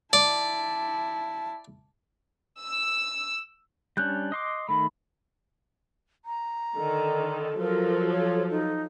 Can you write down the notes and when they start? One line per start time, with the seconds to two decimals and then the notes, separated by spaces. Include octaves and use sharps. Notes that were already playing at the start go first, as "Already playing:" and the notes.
0.13 E4 D5 A5
2.61 E6
3.97 G3 C#4 D4 F#6 G6
4.32 D#5 C6 D6
4.69 D#3 A3 B5
6.25 A#5
6.77 D3 D#3 A4
7.60 F3 F#3 A4 A#4
8.10 C#5
8.50 D#4